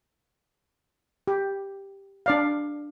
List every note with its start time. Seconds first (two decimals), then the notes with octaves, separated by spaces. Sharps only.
1.27 G4
2.26 D4 D5 F5